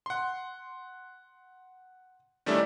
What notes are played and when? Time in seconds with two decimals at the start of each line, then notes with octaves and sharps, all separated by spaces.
0.06 F#5 C6
2.46 D#3 G3 A3 C#4 D4 E4